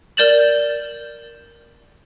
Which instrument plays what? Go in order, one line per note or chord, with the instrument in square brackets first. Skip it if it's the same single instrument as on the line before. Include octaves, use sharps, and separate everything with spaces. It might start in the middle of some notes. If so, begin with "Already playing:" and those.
[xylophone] A#4 D5 G6 A6 E7 F#7